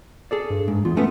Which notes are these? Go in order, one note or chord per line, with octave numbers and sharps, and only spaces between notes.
G#4 A4 D5
G2
G#2
E2 F4
A3 B3 C#4 B4